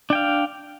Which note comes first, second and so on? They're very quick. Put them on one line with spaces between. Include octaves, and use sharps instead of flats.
D4 G5 F5